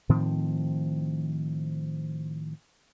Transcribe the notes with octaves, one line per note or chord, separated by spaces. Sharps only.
A2 D#3 F3 C4